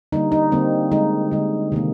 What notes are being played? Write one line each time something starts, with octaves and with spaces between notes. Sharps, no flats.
D3 G3 A#3 D#4
D#4
D3 G3 A#3 C4
D3 G#3 D#4
D3 G#3
C3 D#3 A#3